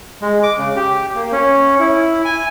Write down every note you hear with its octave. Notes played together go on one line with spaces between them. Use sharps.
G#3
D6
C#3
G4
A#3
C#4
E4
G#5